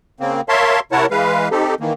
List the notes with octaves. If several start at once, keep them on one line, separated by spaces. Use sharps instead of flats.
C#3 A#3 C4
A#4 C#5 E5 F5 A5 C6
C3 E4 A#4 C#5 F#5 A5
E3 G#3 B4 F5
C4 D#4 G4 A4
D#3 E3 A#3